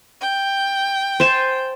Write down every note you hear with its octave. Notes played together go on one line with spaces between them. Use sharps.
G5
C5 G#5 A5